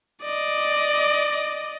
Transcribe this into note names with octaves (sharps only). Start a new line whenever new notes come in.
D5 D#5